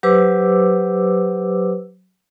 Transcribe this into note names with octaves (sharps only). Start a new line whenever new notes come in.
F#3 G4 B4 C5 D6 E6